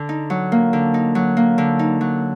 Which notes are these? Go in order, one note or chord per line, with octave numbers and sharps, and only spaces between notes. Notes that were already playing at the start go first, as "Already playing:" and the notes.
Already playing: D3
D#4
F#3
A#3
D3
D#4
F#3
A#3
D3
D#4
F#3